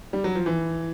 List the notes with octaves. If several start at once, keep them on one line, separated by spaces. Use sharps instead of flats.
G3
F#3
F3
E3